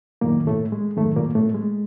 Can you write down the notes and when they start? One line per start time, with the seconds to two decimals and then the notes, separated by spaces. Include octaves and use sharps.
0.21 F#2 A#2 D#3 A#3
0.47 A2 A3
0.72 G#3
0.97 F#2 A2 D#3 A3
1.16 A#2 A#3
1.35 A2 A3
1.54 G#3